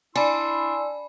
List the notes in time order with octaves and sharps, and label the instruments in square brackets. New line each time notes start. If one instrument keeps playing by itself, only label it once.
[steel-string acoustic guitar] D4 [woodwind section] E4 C6 E6 [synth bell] G#5 B5